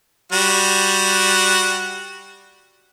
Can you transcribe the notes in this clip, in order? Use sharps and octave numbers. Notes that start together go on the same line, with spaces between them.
G3 F#4